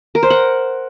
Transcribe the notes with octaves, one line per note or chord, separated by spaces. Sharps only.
A#4
C5
F#5